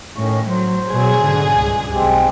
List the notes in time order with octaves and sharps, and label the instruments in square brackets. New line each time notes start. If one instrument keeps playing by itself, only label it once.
[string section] A2 [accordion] D#3 C#4 C#6
[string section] F#3 [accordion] C5
[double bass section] B2 F#3 [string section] G#4
[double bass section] G#2 D3
C#2 G2
[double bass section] B1 [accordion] G#3 C4 G4